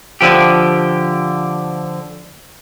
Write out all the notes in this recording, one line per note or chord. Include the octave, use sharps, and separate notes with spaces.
D3 F3 G4